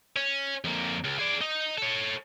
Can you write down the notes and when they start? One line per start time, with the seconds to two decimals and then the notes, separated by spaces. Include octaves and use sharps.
0.16 C#4
0.64 F2 A#3
1.04 C#2
1.19 G#4 D5
1.41 D#4
1.78 A4 C#5